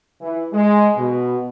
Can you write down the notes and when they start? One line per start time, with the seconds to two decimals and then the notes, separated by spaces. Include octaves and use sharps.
0.21 E3
0.53 G#3
0.96 B2